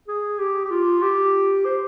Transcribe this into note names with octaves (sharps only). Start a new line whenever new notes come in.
G#4
G4
G4
F4
G4
C5